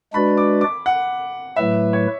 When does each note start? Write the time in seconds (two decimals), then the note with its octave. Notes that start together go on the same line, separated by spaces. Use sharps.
0.14 G#3 D4 F#4 B4 D5 B5
0.37 D6
0.61 D6
0.86 F#5
1.56 A2 F#3 A3 E4 B4 E5
1.93 C#5